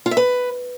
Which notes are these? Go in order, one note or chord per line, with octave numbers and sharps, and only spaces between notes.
F4
E5
B4